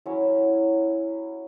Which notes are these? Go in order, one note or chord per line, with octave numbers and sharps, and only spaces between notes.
F#3 C#4 E4 C#5 E5